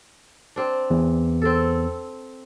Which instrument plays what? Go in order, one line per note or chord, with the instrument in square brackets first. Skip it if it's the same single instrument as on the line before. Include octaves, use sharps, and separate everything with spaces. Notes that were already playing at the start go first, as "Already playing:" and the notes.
[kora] C4 D4
[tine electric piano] E2
[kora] C4 A4